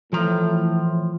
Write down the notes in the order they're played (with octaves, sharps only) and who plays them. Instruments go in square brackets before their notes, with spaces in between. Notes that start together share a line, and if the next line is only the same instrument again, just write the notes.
[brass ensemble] A2 [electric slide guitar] E3 A#5 [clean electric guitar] F3